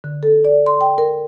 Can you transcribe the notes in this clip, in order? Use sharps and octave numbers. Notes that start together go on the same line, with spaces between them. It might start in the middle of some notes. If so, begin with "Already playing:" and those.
D3
A4
D5
C6
G5
A#4